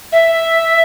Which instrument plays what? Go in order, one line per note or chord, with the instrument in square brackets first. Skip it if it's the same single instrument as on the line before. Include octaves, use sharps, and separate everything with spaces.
[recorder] E5